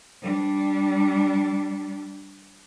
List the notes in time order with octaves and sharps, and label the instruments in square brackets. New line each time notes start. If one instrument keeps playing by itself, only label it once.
[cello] G3 D4